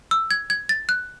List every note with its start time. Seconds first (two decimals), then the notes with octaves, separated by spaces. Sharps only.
0.11 E6
0.31 G#6
0.50 G#6
0.69 A6
0.89 F#6